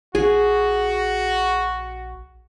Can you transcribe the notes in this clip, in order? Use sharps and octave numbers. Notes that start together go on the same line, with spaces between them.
A#1 F#4 G#4